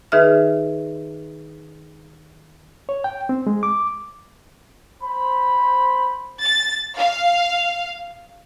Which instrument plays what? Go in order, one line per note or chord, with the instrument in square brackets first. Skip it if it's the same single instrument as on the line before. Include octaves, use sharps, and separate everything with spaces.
[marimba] D#3 D#4 G#4 B4 E5 F6
[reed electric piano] C#5
G5
C4
G#3
D6
[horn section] C5 B5
[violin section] A6
F5